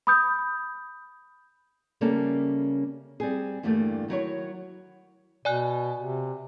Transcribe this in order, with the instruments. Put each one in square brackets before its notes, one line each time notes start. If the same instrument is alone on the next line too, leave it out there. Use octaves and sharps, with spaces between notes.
[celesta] B5 D#6 G6
[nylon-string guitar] C#3 G3 A#3 C#4 A4 E5
G3 C4 G#4
E2 G2 D3 G3 A3 A#3
D#3 F#3 E4 C#5
[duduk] B2 [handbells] D5 G#5 F#6
[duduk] C3